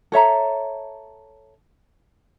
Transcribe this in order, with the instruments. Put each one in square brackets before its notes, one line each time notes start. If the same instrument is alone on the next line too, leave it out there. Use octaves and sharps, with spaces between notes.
[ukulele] A4 C#5 E5 A#5